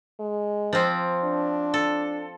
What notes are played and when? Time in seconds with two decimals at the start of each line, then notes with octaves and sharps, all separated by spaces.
0.19 G#3
0.73 F3 C4
1.24 D4
1.74 A4